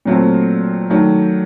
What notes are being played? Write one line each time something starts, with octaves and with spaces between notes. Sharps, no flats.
A#2 F#3 A3 C4
D#3 F#3 A3 D4